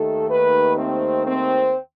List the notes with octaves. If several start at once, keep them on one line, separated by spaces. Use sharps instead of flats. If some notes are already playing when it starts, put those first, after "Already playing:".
Already playing: D#2 D#3 A3 A4
B4
C4
C4